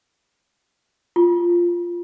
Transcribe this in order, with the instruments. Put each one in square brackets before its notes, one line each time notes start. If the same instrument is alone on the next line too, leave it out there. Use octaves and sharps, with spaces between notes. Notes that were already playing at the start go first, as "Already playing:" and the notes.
[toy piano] F4